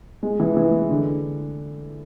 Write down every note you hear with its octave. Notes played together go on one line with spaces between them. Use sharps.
G#3
E3
E3
D3